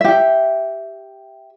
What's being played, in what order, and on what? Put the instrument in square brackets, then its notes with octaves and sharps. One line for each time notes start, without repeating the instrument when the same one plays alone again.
[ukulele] G4 E5